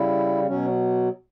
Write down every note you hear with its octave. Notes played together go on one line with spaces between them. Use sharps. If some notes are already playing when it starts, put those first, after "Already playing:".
Already playing: C#3 G3 E4
B2 F#3 C#4